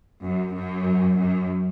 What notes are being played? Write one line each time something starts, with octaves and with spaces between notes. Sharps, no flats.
F#2
F#2
F#2